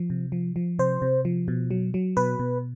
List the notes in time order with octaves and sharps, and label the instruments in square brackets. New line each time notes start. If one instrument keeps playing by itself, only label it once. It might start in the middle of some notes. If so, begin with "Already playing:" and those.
Already playing: [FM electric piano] F3
C3
F3
F3
C3 C5
C3
F3
B2
F#3
F#3
B2 B4
B2